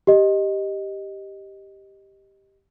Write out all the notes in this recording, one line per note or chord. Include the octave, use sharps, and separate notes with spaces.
G4 D#5